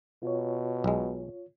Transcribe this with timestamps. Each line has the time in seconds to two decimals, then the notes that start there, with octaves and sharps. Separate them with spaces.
0.23 B2 F4 C#5
0.84 B1 G#3